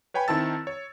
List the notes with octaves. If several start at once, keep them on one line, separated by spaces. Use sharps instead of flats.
B4 C#5 G5 G#5 B5
D#3 C4 E4 A5 E6 A6
C#5